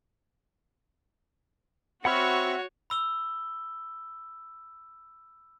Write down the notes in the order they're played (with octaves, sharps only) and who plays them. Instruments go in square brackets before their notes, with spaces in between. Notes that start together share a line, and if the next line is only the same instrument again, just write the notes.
[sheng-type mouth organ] C4 E5 C#6 [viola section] F#4 [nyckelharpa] C#5 [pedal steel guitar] F#5 B5 F6
[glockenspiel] B5 E6 G7